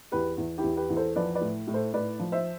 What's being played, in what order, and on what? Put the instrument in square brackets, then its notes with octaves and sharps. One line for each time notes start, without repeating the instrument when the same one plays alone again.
[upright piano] E2 G4 B4
E2
E4 G4
E2
G4 B4
E2
A4 C5
F3 B4 D5
B4 D5
A2
A2
A4 C5
A2 B4 D5
F3
C5 E5